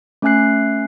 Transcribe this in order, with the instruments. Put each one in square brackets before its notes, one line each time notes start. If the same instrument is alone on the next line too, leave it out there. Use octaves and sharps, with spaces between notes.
[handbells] A3 C#4 E5 G#5 F#6 C7